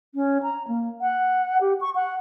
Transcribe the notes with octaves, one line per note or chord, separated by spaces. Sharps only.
C#4
A#5
A#3
F#5
G4
C#6
F#5